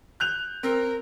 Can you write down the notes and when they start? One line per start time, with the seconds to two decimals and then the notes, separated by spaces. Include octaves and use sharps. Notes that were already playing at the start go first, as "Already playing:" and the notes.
0.20 F#6 G6 F7
0.63 C4 A#4